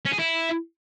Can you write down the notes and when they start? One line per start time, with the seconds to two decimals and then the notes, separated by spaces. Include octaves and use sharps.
0.05 C#4
0.12 G#4
0.19 E4